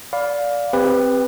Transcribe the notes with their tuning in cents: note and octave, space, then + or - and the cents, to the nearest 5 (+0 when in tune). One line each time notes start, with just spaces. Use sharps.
D5 -15 F5 +15 B5 +0
C4 +0 G4 +35 B4 +0